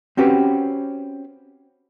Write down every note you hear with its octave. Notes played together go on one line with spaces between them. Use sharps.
C4 C#4 F#4 G4 B4